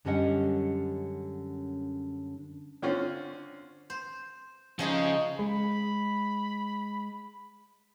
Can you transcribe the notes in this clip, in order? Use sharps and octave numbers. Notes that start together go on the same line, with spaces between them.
F#2 D3 G3 C#4 D#5 F#5
D3 C4 C#4 F4
C5
C#3 F3 G#3 D#4
G#3 B5